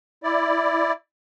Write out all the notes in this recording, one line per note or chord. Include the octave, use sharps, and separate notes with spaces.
E4 D5